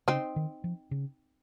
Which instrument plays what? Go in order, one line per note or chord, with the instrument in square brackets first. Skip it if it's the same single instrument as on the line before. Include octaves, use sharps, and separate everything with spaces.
[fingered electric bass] C#3 [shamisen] C4 D#4
[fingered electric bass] D#3
F3
C#3